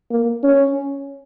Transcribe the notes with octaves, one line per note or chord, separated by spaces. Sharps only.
A#3
C#4